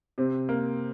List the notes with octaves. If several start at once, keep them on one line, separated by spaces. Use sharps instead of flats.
C3 C4
A#3